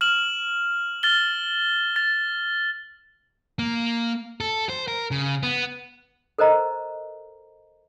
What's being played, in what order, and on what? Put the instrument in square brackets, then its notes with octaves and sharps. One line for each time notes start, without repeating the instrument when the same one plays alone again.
[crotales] F6 E7 F#7
F6 A6 G7
A6
[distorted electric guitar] A#3
A4
C5
A#4
C#3
B3
[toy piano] A4 A#4 C5 D#5 A#5